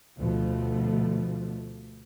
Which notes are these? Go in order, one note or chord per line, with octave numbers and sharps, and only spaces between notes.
D2 B2 F3 A3